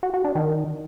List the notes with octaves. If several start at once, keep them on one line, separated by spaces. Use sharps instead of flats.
F#4
F#4
D4
D#3